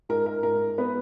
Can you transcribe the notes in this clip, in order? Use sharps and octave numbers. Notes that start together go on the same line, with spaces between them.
G#2 A#4
A#4
G#2 A#4
B3 B4